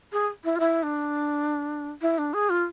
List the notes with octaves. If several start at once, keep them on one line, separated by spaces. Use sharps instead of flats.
G#4
E4
F4
E4
D4
E4
D4
G#4
F4